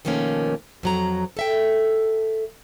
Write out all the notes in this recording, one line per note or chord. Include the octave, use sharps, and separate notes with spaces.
B2 D#3 F3 A3 A#3 C#4
F2 F#3 A#5
A4 E5 G5